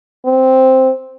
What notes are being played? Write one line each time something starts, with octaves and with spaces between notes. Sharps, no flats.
C4